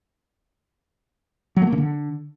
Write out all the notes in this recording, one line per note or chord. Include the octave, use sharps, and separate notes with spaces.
F#3
A3
A#3
C#3
D3